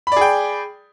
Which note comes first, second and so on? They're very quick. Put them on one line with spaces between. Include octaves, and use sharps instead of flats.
B5 D5 G#4 G5